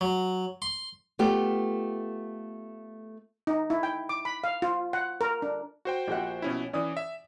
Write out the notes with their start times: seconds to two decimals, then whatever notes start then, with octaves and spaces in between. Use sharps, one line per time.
0.01 F#3
0.62 C6
1.19 A3 B3 F4 G4
3.47 D#4
3.70 E4
3.83 G5
4.09 D6
4.25 B5
4.44 F5
4.62 F4
4.93 F#5
5.21 A#4
5.42 D4
5.85 F#4 C5 G5
6.08 A#1 G4 F#5
6.42 B2 C#4 E4
6.73 E3 C#4 D5 D#6
6.97 E5